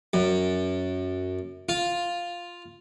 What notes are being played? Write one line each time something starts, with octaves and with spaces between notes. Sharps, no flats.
F#2
F4